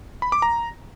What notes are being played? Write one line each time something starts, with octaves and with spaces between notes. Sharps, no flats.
B5
D6
A#5